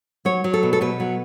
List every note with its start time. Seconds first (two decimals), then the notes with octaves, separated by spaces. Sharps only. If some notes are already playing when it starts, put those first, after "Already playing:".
0.25 F#3 C#5
0.44 F#3
0.54 A4
0.63 B2
0.73 A4
0.81 B2 B4
1.00 F#3